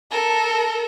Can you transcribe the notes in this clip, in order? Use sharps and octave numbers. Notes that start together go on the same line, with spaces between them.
A4 A#4